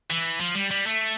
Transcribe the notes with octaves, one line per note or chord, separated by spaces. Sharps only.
E3
F3
G3
G3
A3